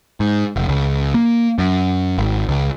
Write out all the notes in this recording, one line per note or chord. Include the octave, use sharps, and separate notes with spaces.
G#2
F1
C#2
A#3
F#2
G#1
C#2